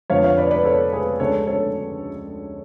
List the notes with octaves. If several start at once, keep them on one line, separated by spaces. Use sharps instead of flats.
F2 D3 F3 B3 C#5 F5
C#5 F5
B4 D5
B4 D5
A4 C#5
G#4 B4
D2 C#3 G#3 A4 C#5
A4 C#5